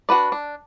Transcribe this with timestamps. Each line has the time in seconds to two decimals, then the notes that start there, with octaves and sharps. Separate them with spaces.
0.09 D4 F#4 B4 D5
0.32 D4